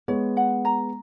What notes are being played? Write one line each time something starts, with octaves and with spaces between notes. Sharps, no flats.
G#3 B3 C#5
F#5
A#5